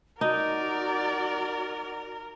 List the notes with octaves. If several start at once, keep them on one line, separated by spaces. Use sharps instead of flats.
D#4 F#4 A#4 D5 F#5